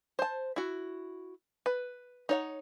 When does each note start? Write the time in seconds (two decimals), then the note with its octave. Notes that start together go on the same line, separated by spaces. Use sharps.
0.19 C5 A5
0.56 E4 F#4
1.66 B4
2.29 D#4 C#5 F#5